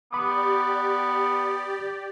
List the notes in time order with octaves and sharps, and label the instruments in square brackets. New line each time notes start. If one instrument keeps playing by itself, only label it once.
[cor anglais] B3 [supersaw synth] G4 D5 [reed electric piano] B5 D6 D#6